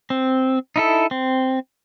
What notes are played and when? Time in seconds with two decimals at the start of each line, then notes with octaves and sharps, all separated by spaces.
0.10 C4
0.76 D#4 E4 A4
1.11 C4